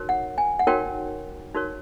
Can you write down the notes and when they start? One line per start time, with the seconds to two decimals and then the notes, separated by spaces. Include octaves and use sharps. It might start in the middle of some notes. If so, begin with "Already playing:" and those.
Already playing: D#4 F#4 A#4 C#5
0.09 F#5
0.38 G#5
0.59 F#5
0.67 D#4 F#4 A#4 C#5 G5
1.55 D#4 F#4 A#4 C#5